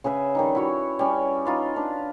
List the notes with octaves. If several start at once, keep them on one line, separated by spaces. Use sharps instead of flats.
C#3 G#4 B4 E5
D#3 G3 D#4
E4 F#4 C#5
G3 C#4
D#4 F4 B4
D4 B4